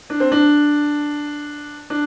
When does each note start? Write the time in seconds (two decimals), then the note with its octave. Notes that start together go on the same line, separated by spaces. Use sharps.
0.10 D4
0.20 C4
0.32 D4
1.90 D4